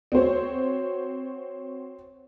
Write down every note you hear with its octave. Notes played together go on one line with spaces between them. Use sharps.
C4 F#4 C5 C#5